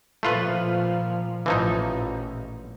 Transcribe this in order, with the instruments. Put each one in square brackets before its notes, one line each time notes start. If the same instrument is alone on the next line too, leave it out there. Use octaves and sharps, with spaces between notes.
[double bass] A#2 F3 [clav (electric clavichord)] A3 F4 B4
[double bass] A1 A#2 [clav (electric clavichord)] E3 F3 D#4